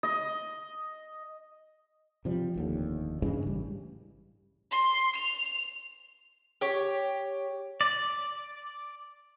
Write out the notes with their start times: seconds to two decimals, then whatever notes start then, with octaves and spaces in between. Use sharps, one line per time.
0.03 D#5
2.25 C3 F3 G3
2.56 F1 D#2 D3
3.22 G2 C#3 E3 G#3
3.46 A1 G3
4.72 C6
5.16 F7
6.61 G4 C#5
7.81 D5